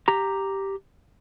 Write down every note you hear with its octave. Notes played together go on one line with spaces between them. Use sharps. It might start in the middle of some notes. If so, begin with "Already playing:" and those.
G4 A#5